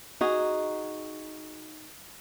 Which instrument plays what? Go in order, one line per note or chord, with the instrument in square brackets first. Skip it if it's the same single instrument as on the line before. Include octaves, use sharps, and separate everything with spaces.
[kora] D#4 F#4 G#4